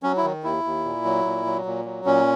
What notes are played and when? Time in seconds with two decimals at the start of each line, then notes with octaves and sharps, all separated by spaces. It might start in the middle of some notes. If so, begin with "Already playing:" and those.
0.03 F#3 C#4
0.17 E4
0.23 D#3
0.44 D#2 E4
0.64 D#2
0.84 A#2
1.05 F#3
1.25 A#2
1.46 F#3
1.66 A#2
1.85 F#3
2.05 A#2 C#4